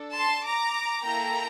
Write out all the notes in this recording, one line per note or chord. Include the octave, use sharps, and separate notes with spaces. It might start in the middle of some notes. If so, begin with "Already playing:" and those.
Already playing: D4 A4
A5 C6
A#5 D6
A#3 E4 A4 G5 A#5